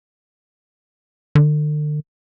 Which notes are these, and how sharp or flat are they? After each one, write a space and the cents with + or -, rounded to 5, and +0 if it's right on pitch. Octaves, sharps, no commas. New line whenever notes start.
D3 +40